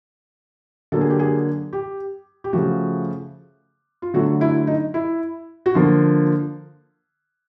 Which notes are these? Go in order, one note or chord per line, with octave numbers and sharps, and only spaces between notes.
D3 F#3 A#3 A4
G#4
G4
G#4
G4
G4
C#3 F3 A3 F#4
F4
D3 F#3 A3 F#4
E4
D#4
E4
F#4
D3 F3 A#3 F4